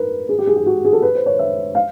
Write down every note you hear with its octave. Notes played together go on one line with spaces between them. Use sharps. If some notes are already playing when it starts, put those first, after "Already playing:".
Already playing: A#4 B4
G#4
G4
G#4
G4
F#4
G#4
A4
B4
C5
C#5
E5
F5